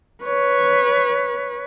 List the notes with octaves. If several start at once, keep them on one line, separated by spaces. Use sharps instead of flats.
B4 C#5